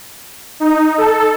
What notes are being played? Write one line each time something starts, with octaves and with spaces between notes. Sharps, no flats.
D#4
A4